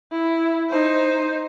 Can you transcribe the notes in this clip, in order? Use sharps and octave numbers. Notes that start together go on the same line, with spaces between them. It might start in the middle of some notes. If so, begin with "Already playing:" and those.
E4
D#4 C5